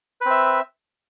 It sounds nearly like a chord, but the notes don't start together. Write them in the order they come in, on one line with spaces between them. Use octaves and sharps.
B4 C4 E5